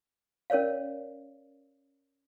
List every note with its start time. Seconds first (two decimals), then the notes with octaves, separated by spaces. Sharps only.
0.50 C#4 A#4 C#5 D5 F5